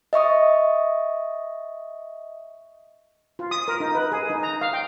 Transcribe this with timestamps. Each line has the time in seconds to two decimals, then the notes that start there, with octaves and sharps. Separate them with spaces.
0.13 D#5 E5 C#6 D#6
3.39 F4
3.51 D#6
3.68 A#4
3.80 D#4
3.95 B4
4.12 G#4
4.30 D#4
4.43 A#5
4.61 F5
4.73 G5